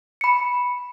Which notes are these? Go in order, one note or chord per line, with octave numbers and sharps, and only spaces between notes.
B5 C#7